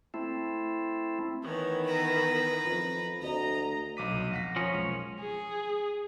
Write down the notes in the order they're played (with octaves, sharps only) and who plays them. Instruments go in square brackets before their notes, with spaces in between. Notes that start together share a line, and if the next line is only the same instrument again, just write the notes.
[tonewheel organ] A3 C4 E4
[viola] D#3 E3 [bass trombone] B3 [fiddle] C#5
[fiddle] B4 A#5
[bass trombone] F2
[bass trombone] D2 [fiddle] D#5 [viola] A#5
[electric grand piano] B1 D6 B6 [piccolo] D#7
[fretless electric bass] C2
[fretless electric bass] F2 [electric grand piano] F5 F#5 B6 [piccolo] A#6
[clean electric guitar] F3 C#4 [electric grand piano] A#4 C#5
[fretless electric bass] B1 G#3 [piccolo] F7
[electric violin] G#4